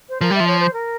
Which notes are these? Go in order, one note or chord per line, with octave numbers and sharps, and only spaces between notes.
C5
F3 A#4
G3 E5
F3
C#5
C5
A#4